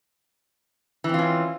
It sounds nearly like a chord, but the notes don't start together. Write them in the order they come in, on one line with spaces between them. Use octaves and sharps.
E3 C4 F4 C#4